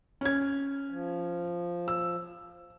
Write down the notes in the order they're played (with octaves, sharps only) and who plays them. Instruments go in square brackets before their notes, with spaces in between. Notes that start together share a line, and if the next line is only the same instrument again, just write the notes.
[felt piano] C#4 G#6
[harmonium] F3
[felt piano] E6